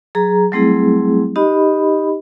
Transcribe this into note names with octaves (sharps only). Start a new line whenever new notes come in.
F#3 G#4 A#5
F#3 G3 A3 C4 E4 G#4
D#4 G4 D#5 B5